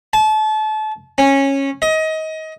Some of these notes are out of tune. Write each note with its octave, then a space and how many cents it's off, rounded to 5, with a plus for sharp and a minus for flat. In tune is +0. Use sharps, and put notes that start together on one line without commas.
A5 -30
C#4 -15
D#5 +25